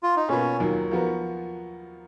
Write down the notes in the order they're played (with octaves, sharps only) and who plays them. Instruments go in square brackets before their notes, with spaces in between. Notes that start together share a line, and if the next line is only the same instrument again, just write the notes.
[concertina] F4
D#4
[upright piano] B2 A#3 F4 B4 [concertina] C#4
[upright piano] D#2 D#3 F#3 A#3 F4
F3 B3 F#4 A#4